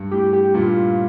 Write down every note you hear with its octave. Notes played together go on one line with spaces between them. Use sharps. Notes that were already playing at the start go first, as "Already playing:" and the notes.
Already playing: G2
A2 G4
G4
G2 A#2 F4